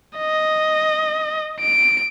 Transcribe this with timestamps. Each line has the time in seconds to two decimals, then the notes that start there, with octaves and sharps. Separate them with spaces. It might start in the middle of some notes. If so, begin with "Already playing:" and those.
0.17 D#5
1.61 D7